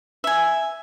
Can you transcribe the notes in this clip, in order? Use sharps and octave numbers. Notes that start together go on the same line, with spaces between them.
E5 G#5